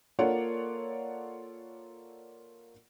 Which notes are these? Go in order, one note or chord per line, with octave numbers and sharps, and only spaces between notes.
A#3 F4 A4 C#5 D5 F#5